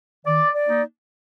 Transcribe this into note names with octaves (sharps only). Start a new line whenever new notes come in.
D#3 D5
D5
A#3 D#4